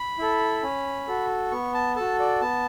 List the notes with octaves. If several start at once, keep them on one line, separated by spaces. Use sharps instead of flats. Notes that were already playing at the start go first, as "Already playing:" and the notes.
Already playing: B5
E4 A4
C#4
F#4 A4
B3 C#6
A5
F#4 A4 A5
D5
B3 A5